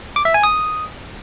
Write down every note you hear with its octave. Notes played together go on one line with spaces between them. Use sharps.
D6
E5
G#5
D#6